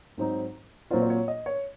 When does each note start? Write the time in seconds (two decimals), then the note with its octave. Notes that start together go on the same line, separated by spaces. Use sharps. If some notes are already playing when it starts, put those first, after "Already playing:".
0.18 G#2 F#3 C4 D#4
0.90 A#2 F#3 C4 F4 C5
1.02 C5
1.10 C#5
1.28 D#5
1.46 C#5